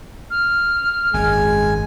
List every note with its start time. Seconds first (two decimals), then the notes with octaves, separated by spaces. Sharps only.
0.30 F6
1.14 G#1 F#2 G#3 G#5